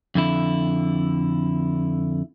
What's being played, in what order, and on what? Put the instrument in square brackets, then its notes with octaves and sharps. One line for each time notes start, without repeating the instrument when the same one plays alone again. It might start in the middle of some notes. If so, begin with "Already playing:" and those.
[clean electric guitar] F2 D3 E4